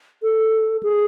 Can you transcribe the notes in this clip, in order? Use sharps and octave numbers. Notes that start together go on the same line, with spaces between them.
A4
G#4